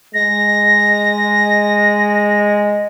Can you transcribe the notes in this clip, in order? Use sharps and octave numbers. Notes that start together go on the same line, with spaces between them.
G#3 A#6